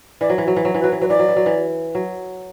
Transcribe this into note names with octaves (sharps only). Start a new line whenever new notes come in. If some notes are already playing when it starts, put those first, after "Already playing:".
E3 D5
F#3
E3
F#3
E3
F#3
E3
B4
F#3
E3
F#3 B4
E3 D5
F#3
E3
F#3
E3
F#3